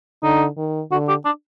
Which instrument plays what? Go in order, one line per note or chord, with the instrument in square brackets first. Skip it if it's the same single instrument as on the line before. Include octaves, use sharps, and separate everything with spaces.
[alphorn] D3 [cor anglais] D#4
[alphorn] D#3
[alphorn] D3 [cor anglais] F#4
[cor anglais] G4
D4